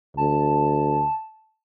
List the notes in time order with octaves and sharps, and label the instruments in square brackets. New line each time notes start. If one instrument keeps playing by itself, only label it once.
[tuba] D2 [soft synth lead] A5